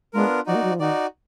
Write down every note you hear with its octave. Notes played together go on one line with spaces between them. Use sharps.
G#3 B3 D4 F4 A#4
F3 D#4 F#4 D5
A#3
F#3
F3
D#3 D#4 F#4 D5